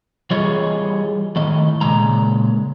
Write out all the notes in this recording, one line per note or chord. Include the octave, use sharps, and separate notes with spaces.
E3 G3 F4 G#4 C#5 D#5
A2 D#3 D#5
A#2 C#3 G#3 A#5